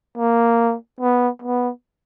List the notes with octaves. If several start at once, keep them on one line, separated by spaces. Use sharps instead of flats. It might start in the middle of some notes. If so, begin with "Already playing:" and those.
A#3
B3
B3